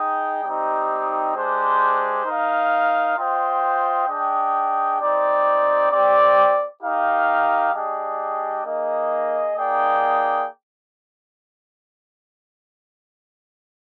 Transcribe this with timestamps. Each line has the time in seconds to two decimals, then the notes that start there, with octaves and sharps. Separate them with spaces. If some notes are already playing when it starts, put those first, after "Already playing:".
Already playing: D#4 G#4 D#5 G5
0.43 G3 C4 D#4 G4
1.34 G#3 D4 G4 C5
2.25 D#4 A#4 F5
3.17 F4 C5 D#5 G5
4.08 D4 G#4 D#5 G5
5.00 C4 D#4 G4 D5
5.91 C4 G4 D5
6.82 D#4 G4 A#4 F5
7.73 G3 D4 G#4 D#5 G5
8.64 A#3 D#4 G#4 D#5
9.56 A#3 D#4 G#4 D5 G5